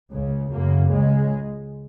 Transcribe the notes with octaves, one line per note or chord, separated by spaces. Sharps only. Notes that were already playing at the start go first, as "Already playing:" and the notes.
C#2 C#3
F#2 C#3 A#3
C#2 C#3 G#3